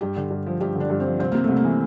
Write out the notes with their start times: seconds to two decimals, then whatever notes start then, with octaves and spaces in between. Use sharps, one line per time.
0.01 G2 G4
0.16 D3
0.31 G2
0.46 F3
0.61 G2 G4
0.75 D3 D4
0.90 G2
1.00 C4
1.06 F3
1.19 C2 C4
1.32 C3 A#3
1.44 C2 A3
1.56 A#3
1.65 E3